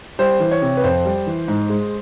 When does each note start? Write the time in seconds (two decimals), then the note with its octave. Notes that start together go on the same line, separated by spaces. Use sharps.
0.19 G3 C5
0.40 E3
0.51 C#5
0.62 C3
0.77 B4
0.84 F2 C5
1.05 G3
1.27 E3
1.48 G#2
1.70 G#3